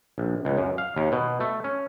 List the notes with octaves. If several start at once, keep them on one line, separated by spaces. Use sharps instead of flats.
A#1
C#2
F#2
F5
D#2
B2
A3
C#4